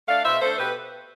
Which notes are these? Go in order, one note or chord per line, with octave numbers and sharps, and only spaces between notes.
A3 D4 D5 F5
B2 C5 E5
A3 D4 A4 C5
B2 G4 B4